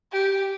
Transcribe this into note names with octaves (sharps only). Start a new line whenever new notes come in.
G4